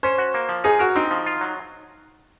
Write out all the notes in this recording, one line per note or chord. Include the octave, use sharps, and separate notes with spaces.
C#4 C5
F#4
A#3
F3
D#4 G#4
F#4 A#4
C4 D#4
F3
F4
F#3